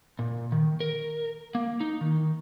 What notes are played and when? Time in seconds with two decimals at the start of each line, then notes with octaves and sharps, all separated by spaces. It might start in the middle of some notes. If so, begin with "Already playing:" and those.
0.19 A#2
0.52 D#3
0.80 A#4
1.55 A#3
1.80 D#4
2.01 D#3